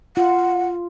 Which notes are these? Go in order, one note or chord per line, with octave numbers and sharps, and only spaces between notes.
F4 F#5